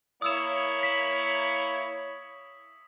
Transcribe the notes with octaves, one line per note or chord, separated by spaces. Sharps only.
A#3 E4 C#5 D#6 E6 E7
B6 E7 F#7